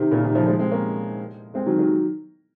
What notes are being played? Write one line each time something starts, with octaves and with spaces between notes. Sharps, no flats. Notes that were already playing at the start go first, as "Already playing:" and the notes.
Already playing: C3 D#3
A#2 C#3
C3 D#3
C#3 F3
F3 G#3
G#3 C4
A#3 C#4
G#3 C4
D#3 F#3
D#3 F#3